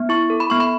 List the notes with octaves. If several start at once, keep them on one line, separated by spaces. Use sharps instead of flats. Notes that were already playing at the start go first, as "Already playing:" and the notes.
Already playing: B3
E4 C#6
A4
B5
B3 C#6
B5